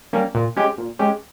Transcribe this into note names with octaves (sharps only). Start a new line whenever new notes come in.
G3 A#3 C#4
A#2
G#3 C#4 G4
A#2
G#3 C#4 G4